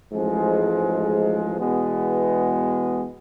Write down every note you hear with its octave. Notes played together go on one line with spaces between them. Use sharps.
A1 G#2 F3 G#3
E2 B2 G#3 B3